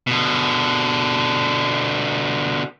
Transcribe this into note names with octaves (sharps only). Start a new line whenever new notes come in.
B2 D3